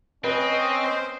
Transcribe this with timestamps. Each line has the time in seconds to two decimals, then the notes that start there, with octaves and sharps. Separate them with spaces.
0.24 C4 C#4 B4 D#5
0.83 C5